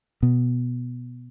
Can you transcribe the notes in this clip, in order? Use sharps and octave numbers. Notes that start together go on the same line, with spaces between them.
B2